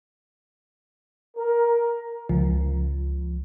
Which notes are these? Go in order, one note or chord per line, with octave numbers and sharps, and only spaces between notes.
A#4
C#2 F3